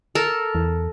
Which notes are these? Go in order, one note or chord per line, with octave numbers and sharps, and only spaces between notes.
A4 A#4
E2